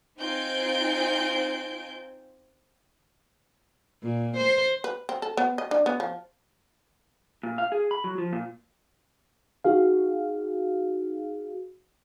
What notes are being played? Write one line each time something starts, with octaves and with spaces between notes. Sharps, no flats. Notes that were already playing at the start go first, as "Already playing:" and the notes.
C4 D#4 F4 G#5 G6 D7
A#2
C5
B4
C4
A4
B3
D#5
D4
B3
F3
A#2
F5
G#4
B5
F#3
F3
A#2
D#4 F#4 G#4 F5